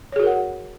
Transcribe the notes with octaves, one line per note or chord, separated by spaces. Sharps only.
F#4 G#4 A#4 C#5 F#5